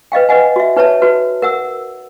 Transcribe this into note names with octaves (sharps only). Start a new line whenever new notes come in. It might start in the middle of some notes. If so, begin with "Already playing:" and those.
B4 D#5 F5 G5
B4 D#5 F#5 G#5
F#4 E5
D#4 B4 C#5 E5 A5
F#4 B4
A#4 F#5 E6